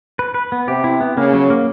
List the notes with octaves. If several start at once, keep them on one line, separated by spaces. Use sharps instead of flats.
B4
B4
B3
C3 G4
E4
B3
C#3 A#3
F#3
A#3